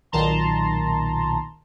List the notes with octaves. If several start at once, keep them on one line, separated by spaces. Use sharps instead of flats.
B1 A#2 D#3 A5 A#5 C6